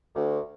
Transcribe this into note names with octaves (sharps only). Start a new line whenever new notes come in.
D2